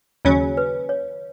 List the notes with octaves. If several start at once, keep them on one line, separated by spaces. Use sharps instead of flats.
D#2 C#3 F#3 C#4 C#5
B4
C#5